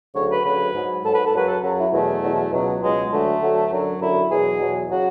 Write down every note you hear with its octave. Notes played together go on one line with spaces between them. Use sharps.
D2 C#3 F#3 C#5
B4
D2 C#3 F#3 B4
G#2 F#3
G#2 F#3 A4
B4
A4
F#2 C#3 F#3 B4
A4
F#2 C#3 F#3
E4
E2 B2 F#3 A3
E2 B2 F#3
C#2 B2 F#3
C#2 B2 F#3 G#3
D2 D3 F#3 A3
D2 D3 F#3
F#2 D3 F#3
F#2 D3 F#3 E4
E2 B2 F#3 G#4
E2 B2 F#3
C#3 F#3 F#4